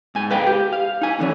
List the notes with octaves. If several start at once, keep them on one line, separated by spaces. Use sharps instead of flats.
G#2 G#5
B4 C5 F5 G5
G4
F5
D#4 G#5
A2 D3 E3 C#4